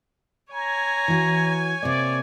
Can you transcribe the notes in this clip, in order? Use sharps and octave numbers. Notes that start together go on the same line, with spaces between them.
C#5 G#5 A#5
E3 F#4
C3 A#3 D5